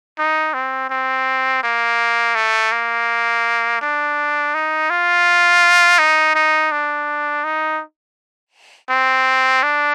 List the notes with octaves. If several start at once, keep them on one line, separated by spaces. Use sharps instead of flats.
D#4
C4
C4
A#3
A3
A#3
D4
D#4
F4
D#4
D#4
D4
D#4
C4
D4